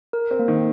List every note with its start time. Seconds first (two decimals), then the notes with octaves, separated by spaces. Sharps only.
0.13 A#4
0.31 C4
0.39 A#3
0.48 D#3